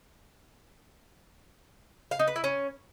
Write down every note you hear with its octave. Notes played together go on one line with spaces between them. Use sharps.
F5
D#4
B4
E4
C#4